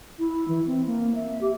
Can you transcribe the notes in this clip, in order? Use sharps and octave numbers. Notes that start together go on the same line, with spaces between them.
E4
E3
C4
A#3
E5
G4